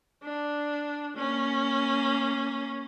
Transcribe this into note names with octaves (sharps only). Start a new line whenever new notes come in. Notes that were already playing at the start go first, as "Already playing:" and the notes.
D4
A#3 C#4